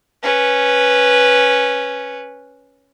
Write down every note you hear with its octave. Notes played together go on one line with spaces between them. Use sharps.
C#4 B4